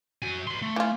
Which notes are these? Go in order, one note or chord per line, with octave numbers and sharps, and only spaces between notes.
F#4 G#5
B4 C6
A3
E3 F4